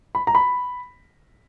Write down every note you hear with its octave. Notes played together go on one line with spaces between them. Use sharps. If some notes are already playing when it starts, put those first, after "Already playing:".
B5
A#5
B5